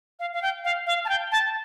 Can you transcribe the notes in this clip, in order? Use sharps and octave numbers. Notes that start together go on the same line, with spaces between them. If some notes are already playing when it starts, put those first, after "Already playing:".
F5
F5
G5
F5
F5
A5
G5
A5